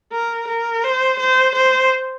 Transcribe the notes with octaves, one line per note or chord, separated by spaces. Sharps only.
A#4
A#4
C5
C5
C5